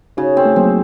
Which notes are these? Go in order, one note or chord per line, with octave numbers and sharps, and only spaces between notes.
C#3 D#4 F#4
C4
A3
F#3 A#3 C4